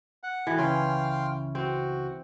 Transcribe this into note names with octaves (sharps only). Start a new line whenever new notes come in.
F#5
E3 F#4 G4 A4
C#2 C#3 C#4 F5 G5 C6
C4 F#4